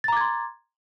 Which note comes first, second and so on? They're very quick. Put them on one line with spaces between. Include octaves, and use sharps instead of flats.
A6 A#5 D6 G#6 C6